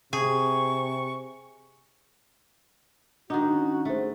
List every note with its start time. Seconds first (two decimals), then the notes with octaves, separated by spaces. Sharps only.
0.13 C3 G#4 C#6
3.30 D#3 D4 D#4 F#4
3.52 C#4
3.85 A3 G#4 C5